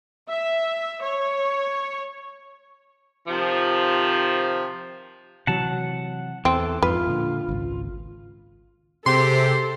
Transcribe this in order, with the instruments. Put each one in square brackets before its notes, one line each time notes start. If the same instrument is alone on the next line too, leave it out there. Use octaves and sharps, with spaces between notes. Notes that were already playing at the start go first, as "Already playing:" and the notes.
[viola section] E5
C#5
[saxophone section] C3 D#3 F3
[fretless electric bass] C3 E3 F#3 [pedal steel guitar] F#5 A5
[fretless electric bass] E2 [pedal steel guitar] E3 A4 [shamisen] C4
[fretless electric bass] F2 G#2 [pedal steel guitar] F4 [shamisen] B4
[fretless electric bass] A#2 D3
G#1 C#2
[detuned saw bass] C3 [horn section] G#3 C4 G4 [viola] A4 C5 [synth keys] C6